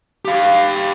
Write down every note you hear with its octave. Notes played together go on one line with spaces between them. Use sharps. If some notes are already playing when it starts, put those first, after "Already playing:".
G4 F5